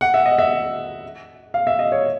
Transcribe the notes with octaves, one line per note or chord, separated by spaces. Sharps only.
F#5
E5
D#5
E5
F5
E5
D#5
C#5